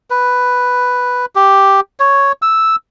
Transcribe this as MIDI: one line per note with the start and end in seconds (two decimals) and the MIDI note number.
0.10 1.26 71
1.35 1.80 67
2.00 2.32 73
2.42 2.76 88